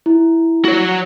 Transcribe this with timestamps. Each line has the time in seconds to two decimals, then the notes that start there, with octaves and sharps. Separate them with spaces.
0.06 E4
0.65 F#4 C#5